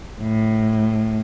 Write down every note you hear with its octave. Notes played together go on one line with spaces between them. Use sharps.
A2